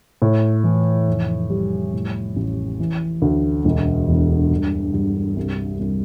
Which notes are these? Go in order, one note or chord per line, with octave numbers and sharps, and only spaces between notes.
A2
E3
F1
G3
A2
A1
E3
D2
E1
E2
G2
G2
C2
C2